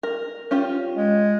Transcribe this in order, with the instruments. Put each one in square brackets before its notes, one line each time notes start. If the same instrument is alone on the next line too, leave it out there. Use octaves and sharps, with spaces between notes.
[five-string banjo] A#4
C#4 F4 G4
[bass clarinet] G#3